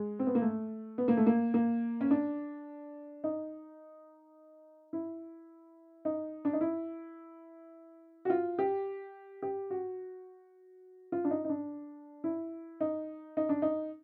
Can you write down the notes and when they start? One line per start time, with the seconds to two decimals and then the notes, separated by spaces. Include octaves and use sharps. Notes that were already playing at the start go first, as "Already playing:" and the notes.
Already playing: G#3
0.19 C4
0.27 B3
0.35 A#3
0.42 A3
0.98 B3
1.08 A#3
1.17 A3
1.26 A#3
1.54 A#3
2.01 C#4
2.11 D4
3.24 D#4
4.93 E4
6.05 D#4
6.45 D4
6.53 D#4
6.61 E4
8.25 F#4
8.30 F4
8.59 G4
9.42 G4
9.70 F#4
11.12 F4
11.25 D4
11.31 D#4
11.45 D#4
11.49 D4
12.24 E4
12.80 D#4
13.37 D#4
13.49 D4
13.62 D#4